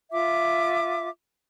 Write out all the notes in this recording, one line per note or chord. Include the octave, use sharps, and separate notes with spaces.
F4 E5 D6